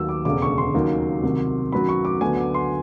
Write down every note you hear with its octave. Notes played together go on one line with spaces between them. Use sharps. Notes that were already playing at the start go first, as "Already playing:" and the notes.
Already playing: D#2 D#3 F#3 A#3 E6
D6
E1 D2 C#3 D6
C#6
C6
D#2 C#3 F#3 A#3 D#4
C2 C3 D#3 F#3
F#2 D#3 F#3 B5
C#6
D6
D2 D3 F#3 B3 G#5
D6
C6